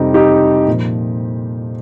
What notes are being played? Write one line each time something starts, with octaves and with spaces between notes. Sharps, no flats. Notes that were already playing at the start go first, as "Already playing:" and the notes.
Already playing: F2 C3 G3 D#4 G4
D#4 G4
A#2 F3